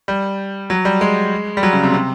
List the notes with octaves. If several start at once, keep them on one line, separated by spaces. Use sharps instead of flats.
G3
F#3
G3
G#3
G3
F#3
C#3
C3
C3